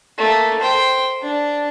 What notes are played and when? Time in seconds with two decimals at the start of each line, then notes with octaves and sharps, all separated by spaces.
0.18 A3 A#3
0.60 C5 G5
1.22 D4